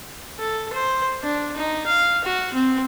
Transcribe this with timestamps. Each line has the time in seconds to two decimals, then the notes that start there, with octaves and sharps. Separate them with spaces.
0.39 A4
0.73 C5
1.22 D4
1.56 D#4
1.86 F5
2.24 F#4
2.54 C4